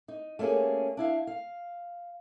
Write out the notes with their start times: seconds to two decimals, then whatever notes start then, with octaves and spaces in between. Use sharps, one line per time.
0.08 D#4
0.39 A3 A#3 C#4 G4 G#4
0.97 D4 E4 F5
1.27 F5